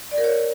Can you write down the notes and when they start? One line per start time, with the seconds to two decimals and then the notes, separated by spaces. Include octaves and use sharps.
0.11 D5
0.18 A#4
0.24 C#5